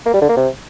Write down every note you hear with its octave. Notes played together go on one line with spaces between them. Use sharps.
A#3
G3
D3
A#3
C3